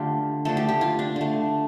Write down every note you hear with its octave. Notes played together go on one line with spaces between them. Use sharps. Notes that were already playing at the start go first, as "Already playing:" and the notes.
Already playing: D3 A3 D4 F4 G4
D3 F3 A3 A4
G4
G4
F4
D4
D3 A3